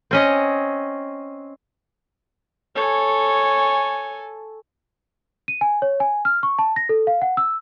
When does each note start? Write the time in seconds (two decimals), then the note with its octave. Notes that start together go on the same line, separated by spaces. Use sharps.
0.11 C4 C#4 D#5
2.75 A4 C#5 G#5
5.48 D#7
5.61 G#5
5.82 C#5
6.00 G#5
6.25 F6
6.43 C#6
6.59 A5
6.76 A#6
6.89 A4
7.07 F5
7.22 F#5
7.37 E6